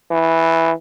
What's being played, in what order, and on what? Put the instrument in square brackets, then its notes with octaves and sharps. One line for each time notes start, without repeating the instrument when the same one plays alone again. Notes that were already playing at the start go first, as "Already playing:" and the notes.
[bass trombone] E3